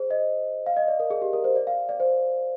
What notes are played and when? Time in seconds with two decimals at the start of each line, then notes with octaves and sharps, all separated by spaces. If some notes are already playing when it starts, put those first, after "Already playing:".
Already playing: G#4 C5
0.11 D#5
0.66 F5
0.77 D#5
0.88 D5
1.00 A#4
1.10 G#4
1.22 G4
1.33 A#4
1.44 C5
1.56 D5
1.67 F5
1.89 D5
2.00 C5